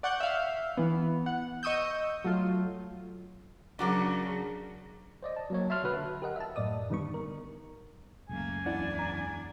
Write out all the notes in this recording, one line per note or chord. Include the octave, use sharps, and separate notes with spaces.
D5 F#5 C#6 G6
E5 F5
E3 B3
F#5
D#5 C#6 D#6 E6 G6
F#3 A3 F4
C#3 F#3 D4 F#4 A#4
C5 D5 D#5
A5
F#3 A#3 C#5
E5 A5 C6 F6
D3 F#4 B4
G4 A#4 D#5 F#5
E5 A5
F#2 A2 D5 D#5 D#6
D3 D#3 G3 B3 D#4 C#6
A#4
F#1 C#2 A3 A#3 G#5
E2 D4 E4 D5 F#5
A#5